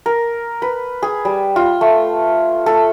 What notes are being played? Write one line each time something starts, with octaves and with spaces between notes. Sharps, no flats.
A#4
B4
G#4
G3
F4
A3
A4